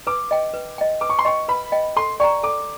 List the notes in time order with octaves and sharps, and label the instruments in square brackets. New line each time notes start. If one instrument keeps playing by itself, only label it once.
[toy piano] B4 [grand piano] D6
[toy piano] D#5 G5
B4
D#5 G5
[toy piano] B4 [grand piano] D6
[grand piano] C#6
C6
[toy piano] D#5 G5 [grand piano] C#6
[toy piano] B4 [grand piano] B5
[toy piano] D#5 G5
[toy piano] A4 [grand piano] C6
[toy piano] D5 G5 A#5 [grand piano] C#6
[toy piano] A4 [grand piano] D6